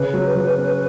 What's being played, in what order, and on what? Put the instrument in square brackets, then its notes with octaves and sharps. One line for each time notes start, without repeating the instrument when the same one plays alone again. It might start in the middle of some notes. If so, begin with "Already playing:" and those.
Already playing: [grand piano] C#3 [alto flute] B4
[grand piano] F#3
F#3
C#4